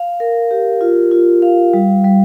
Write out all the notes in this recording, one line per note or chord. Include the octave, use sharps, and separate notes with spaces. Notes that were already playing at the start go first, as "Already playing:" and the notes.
Already playing: F5
A#4
G4
F4
F4
F5
G3
G3